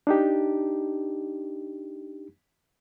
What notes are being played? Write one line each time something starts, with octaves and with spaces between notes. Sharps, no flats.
D4 D#4 G4